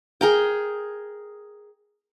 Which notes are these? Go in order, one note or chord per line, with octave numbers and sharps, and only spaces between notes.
G#4 A#4 G5